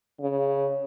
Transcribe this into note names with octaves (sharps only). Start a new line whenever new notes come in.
C#3